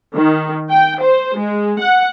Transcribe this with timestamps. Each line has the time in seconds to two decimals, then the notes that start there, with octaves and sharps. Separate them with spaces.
0.14 D#3
0.71 G5
1.00 C5
1.37 G#3
1.80 F#5